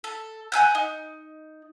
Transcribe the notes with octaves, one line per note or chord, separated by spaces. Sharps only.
A4
F#5 G#5 E6 G6
D#4